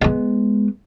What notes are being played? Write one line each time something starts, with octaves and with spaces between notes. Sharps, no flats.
G#3 B3